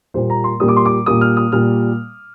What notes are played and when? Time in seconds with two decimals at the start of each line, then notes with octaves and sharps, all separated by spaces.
0.14 A#2 G3 A#3 C5
0.30 A#5
0.44 C6
0.60 A#2 G3 A#3 D#6
0.68 D6
0.76 C6
0.86 D6
1.06 A#2 G3 A#3 D#6
1.21 F6
1.37 D#6
1.52 A#2 G3 A#3 F6